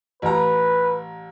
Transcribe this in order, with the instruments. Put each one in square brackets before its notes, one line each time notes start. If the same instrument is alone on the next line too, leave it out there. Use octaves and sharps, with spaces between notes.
[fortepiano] A1 A#5 [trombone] B4